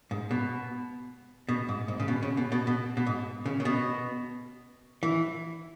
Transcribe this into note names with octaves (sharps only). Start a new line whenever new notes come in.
G#2
B2
B2
G#2
G#2
C#3
B2
C#3
B2
B2
B2
B2
G#2
C#3
C#3
B2
E3